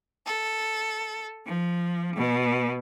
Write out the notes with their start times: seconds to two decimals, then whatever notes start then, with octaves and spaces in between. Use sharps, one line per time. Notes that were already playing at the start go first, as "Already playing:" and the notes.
0.25 A4
1.45 F3
2.15 B2